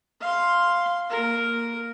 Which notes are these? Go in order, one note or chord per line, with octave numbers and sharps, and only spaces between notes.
F5 C6
A#3 A#4